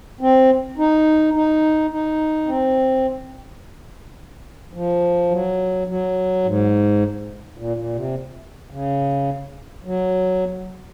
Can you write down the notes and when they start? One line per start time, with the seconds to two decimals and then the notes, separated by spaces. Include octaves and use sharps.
0.21 C4
0.78 D#4
1.34 D#4
1.91 D#4
2.47 C4
4.73 F3
5.31 F#3
5.88 F#3
6.44 G#2
7.58 A#2
7.77 A#2
7.95 C3
8.71 C#3
9.85 F#3